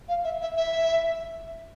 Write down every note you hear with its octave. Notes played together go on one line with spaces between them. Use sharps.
F5
E5
E5
E5